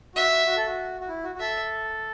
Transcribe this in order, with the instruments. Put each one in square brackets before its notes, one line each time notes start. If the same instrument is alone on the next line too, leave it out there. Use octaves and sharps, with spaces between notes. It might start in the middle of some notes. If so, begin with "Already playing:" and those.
[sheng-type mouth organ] F#4 [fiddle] E5
[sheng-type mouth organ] F#4
F#4
A4
F#4
F#4
E4
F#4
F#4
[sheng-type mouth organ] A4 [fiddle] E5